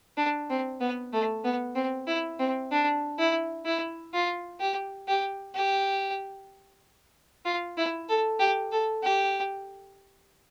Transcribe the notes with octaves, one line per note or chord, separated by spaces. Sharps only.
D4
C4
B3
A3
B3
C4
E4
C4
D4
E4
E4
F4
G4
G4
G4
F4
E4
A4
G4
A4
G4